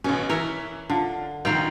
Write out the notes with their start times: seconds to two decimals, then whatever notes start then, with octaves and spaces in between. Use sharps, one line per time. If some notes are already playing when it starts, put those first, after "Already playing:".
0.04 A1 B2 C#4
0.29 E3 A#4 C#5 E5
0.90 D3 F4
1.45 A#1 D#3 F5 G5